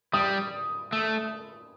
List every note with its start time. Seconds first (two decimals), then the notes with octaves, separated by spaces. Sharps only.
0.13 G3 D#6
0.92 A3